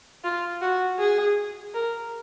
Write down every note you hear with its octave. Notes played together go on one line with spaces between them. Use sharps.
F4
F#4
G#4
A#4